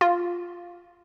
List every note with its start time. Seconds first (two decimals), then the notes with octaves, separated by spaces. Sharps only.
0.01 F4